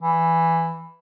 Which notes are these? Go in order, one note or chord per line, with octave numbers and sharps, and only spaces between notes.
E3